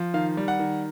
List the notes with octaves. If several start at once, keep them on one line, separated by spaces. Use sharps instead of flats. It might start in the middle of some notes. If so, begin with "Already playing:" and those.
Already playing: F3
D#3 F5
G3
F#5
D#3